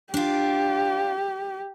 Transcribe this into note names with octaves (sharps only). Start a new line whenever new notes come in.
D4 F4 G4